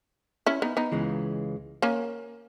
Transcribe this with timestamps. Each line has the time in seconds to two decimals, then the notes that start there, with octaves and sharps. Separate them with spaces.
0.46 C#4 E4
0.62 B3 D#4
0.77 B3 D#4
0.92 C#2 C#3 E3 G#3
1.82 A#3 C#4